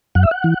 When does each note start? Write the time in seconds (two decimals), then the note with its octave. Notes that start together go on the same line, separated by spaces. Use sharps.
0.15 F#2 F#5
0.23 E5
0.31 F#5
0.44 E3